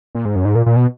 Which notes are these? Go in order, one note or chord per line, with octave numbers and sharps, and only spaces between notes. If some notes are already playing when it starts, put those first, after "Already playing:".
A#2
G#2
F#2
G#2
A#2
A#2
B2